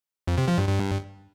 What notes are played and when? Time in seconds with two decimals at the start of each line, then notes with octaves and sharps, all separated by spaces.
0.28 F2
0.38 C3
0.48 F3
0.58 G2
0.68 G2